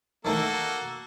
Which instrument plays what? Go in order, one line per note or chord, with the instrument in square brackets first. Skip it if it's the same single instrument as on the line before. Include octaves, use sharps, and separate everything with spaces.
[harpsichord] D#3 E3 A3 [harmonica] A#3 F#4 A4